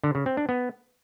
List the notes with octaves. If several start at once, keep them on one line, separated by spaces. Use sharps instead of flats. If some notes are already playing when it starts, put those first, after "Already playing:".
D3
C#3
C4
D4
B3